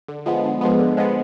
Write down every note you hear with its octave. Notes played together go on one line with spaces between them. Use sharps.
D3
F3 G#3 B3
D3
F3 G#3 B3
D3
F3 G#3 B3